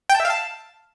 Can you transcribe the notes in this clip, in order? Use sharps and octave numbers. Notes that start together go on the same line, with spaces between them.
G5
A5
E5
F5
A5